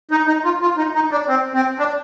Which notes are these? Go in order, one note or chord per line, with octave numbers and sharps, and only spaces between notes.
D#4
D#4
F4
F4
D#4
D#4
D4
C4
C4
D4